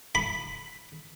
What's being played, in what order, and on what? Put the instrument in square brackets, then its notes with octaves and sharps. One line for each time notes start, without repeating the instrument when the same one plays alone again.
[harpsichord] B5